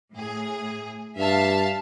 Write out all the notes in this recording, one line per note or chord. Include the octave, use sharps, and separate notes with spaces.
A2 G#4
G2 E5 F5 A5